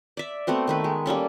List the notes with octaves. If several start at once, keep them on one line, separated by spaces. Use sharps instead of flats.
D5 E5
A3 B3 C4 F#4
D#3 A3 B4
G#3
G3 A#3 C#4 A4